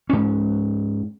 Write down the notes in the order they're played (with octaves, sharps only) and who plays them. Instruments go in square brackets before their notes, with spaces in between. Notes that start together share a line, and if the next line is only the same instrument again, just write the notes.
[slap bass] G#2 C#4